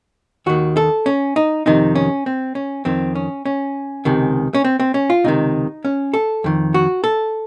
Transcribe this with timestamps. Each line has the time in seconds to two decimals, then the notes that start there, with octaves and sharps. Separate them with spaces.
0.46 D#2 D#3 F#4
0.77 A4
1.06 C#4
1.36 D#4
1.66 F2 C3 D#3 D#4
1.95 C#4
2.26 C4
2.55 C#4
2.85 F2 D#3 C4
3.15 C#4
3.46 C#4
4.05 C#2 C3 D#3
4.55 C#4
4.65 C4
4.80 C4
4.94 C#4
5.10 F4
5.24 C#2 C3 D#3 D#4
5.85 C#4
6.14 A4
6.44 F2 D#3
6.74 F#4
7.04 A4